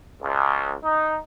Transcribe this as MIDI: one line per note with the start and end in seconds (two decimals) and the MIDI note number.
0.22 0.74 37
0.84 1.18 63